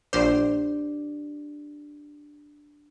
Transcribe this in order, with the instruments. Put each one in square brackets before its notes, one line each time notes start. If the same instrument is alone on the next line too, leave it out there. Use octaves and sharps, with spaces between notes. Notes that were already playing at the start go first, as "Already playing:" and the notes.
[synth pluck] A#1 C5 [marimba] D4 G4 D5